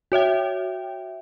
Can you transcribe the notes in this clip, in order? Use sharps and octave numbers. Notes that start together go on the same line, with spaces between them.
F#4 C#5 E5 G5